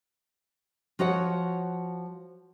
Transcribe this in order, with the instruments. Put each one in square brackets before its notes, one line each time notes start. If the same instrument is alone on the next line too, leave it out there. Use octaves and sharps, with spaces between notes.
[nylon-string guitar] F3 F#4 C#5 F#5